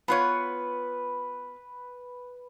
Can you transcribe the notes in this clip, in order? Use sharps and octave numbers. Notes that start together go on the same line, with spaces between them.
B3 F4 B4 C#5